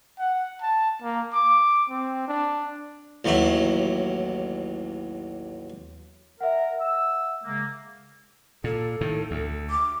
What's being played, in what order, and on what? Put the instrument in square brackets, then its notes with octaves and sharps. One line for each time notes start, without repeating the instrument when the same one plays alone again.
[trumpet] F#5
A5
A#3
D6
C4
D4
[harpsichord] A1 D#2 F#3 E5
[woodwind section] A#4 [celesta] E5 F#5
[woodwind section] E6
C#3 G#3 A#3
[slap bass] A#2 [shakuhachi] A4
[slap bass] A2 D#3
D2
[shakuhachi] D6